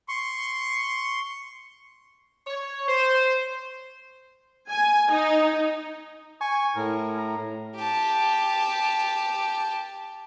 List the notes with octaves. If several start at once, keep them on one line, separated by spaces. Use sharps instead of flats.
C6 C#6
C#5
C5
G#5
D#4
G#5 C#6
A2 A#4
A#5
G4 A5